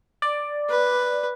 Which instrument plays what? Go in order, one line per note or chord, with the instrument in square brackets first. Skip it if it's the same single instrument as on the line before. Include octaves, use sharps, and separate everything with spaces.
[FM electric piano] D5
[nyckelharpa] B4